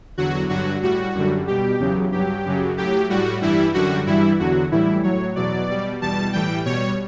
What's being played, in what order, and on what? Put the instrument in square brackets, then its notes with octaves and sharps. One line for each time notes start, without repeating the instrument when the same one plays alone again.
[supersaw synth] E2 D3 F#3 F#4
G2 D3 F#3 F#4
A2 G3 F#4
F#2 D3 G3
B2 G3 G4
E2 C#3 F#3
G2 F#3 G4
F#2 C#3 F#3
A2 F#3 G4
A2 G3 F#4
G2 E3 G3 E4
F#2 D3 G3 F#4
G2 E3 G3 E4
E2 D3 F#3 F#4
A2 E3 G3 E4
A2 F#3 C#5
E2 B2 F#3 D5
B2 G3
E2 B2 G3 A5
A2 E3 G3 G5
B2 G3 C#5